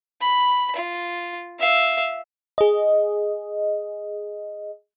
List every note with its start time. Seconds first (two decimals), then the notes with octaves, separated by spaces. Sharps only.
0.21 B5
0.76 F4
1.59 E5 F5
2.58 G#4 D#5